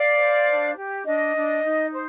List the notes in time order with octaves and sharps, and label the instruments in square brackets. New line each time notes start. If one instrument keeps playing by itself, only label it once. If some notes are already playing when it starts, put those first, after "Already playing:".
Already playing: [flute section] D5 F5
C5
D4
G4
D4 D#5
D4
D#4
C5